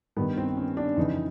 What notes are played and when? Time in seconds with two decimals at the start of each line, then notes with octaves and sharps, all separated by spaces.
0.17 G2 D#3 B3
0.37 C4
0.57 C#4
0.77 D4
0.97 F2 C#3 E3 D#4